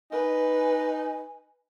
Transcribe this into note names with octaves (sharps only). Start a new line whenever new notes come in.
D#4 B4 G#5